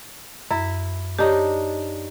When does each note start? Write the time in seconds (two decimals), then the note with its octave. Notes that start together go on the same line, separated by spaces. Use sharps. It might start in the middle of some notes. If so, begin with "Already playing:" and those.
0.51 F#2 E4
1.19 D4 D#4 G4 C#5